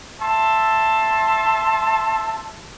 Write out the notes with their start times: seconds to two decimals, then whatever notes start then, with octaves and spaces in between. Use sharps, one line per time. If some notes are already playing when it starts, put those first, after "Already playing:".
0.20 E5 A5 C6